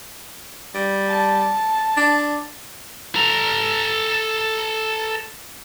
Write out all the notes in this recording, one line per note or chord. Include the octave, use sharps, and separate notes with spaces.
G3
A5
D4
A4 A#5